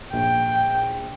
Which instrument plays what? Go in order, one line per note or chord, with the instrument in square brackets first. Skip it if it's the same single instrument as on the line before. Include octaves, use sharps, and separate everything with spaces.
[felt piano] A#1 [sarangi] G5